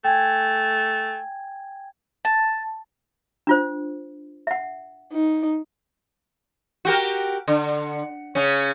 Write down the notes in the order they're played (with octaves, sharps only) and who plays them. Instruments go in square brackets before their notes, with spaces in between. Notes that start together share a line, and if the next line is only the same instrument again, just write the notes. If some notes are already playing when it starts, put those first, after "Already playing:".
[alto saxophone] A3 [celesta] G5 G#5 G#6
[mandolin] A5
[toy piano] D4 F4 C5
E5 F#5
[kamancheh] D#4
[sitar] F#4 G4 A#4
D3
C#3 C#4